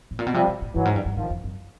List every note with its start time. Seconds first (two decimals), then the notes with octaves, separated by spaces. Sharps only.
0.11 A2
0.19 A#2
0.27 B2
0.34 C3 F3 G3
0.48 B2
0.62 A2
0.75 G2 E3 F#3
0.85 G#2
0.96 G2
1.06 G2
1.16 G#2 D#3 F3
1.30 F2
1.44 F#2